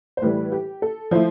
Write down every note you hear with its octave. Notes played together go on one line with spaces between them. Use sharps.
C5
A2 E3 G3 B4
G4
A4
F3 A3 E4 C5